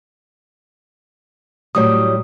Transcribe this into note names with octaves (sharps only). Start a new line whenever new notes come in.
A2 F#3 G3 C#5 D#6